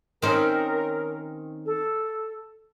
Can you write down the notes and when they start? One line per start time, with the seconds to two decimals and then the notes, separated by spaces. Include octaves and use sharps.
0.22 D#3 C4 C#4 A#4
1.66 A4